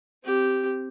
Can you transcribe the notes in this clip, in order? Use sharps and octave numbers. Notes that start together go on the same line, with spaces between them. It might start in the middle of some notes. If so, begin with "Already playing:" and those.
C4 G4